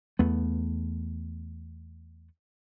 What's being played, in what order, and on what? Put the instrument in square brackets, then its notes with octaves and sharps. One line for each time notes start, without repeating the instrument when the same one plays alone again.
[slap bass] E2 A3 B3